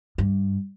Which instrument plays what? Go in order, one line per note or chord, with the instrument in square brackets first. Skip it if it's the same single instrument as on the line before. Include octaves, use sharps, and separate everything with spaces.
[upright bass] G2